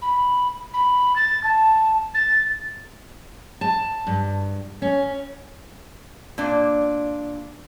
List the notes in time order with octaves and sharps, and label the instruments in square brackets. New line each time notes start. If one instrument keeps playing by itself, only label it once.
[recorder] B5
B5
A6
A5
A6
[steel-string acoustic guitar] A5
G2
C#4
[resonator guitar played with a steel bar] A#2 D4